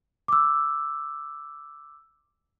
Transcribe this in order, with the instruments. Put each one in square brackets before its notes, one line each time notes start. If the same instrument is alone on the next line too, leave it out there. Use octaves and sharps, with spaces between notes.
[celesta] D6 E6